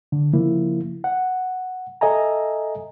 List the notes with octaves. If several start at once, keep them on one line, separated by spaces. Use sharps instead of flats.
D3
C#3 F3 A#3 E4
F#5
A4 D#5 E5 G#5 A#5